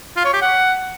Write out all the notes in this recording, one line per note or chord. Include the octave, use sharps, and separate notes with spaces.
F4
C#5
G4
F#5